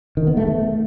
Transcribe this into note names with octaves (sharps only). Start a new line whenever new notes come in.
D#3
B3
A3
A3